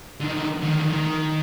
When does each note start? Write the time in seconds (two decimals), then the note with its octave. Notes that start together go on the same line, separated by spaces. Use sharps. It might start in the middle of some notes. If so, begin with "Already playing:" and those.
0.20 D3 D#3
0.62 D3 D#3
0.93 D#3